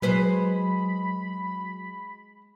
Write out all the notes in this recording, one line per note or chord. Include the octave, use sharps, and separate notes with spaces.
F#3 G#3 B4 C5 B5